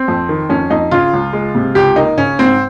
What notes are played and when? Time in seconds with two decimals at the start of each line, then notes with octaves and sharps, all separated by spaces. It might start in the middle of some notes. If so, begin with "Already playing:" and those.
Already playing: C4
0.08 F2
0.29 D#3
0.50 F2 C#4
0.70 F2 D#4
0.91 C#3 F4
1.13 C#2
1.33 G#3
1.55 C3
1.75 C#2 G4
1.96 A#3 D#4
2.18 C#3 C#4
2.39 G#2 C4